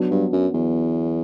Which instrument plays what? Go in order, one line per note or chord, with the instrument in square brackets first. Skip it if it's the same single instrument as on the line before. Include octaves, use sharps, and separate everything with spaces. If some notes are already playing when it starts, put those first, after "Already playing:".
Already playing: [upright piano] F#3 B3 D4
[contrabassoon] G2
F#2
E2